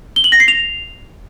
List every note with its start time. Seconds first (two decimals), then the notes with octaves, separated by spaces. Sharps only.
0.16 G7
0.24 F#7
0.32 A#6
0.40 C7
0.48 F7